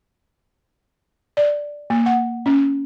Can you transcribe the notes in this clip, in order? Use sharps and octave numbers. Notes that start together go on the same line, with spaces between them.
D5
A#3
F#5
C#4